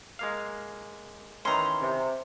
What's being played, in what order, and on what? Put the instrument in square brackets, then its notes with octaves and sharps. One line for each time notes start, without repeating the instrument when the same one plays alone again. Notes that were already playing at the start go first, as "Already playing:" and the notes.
[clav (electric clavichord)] G#3 A#3 F5
[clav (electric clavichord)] D#3 E3 C#4 [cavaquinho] A#5 C6
[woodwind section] C3